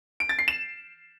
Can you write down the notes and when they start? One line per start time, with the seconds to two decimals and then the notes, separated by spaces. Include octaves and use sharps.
0.20 D7
0.29 A6
0.39 C7
0.48 E7